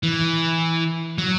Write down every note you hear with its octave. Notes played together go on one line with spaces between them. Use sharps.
E3
F#3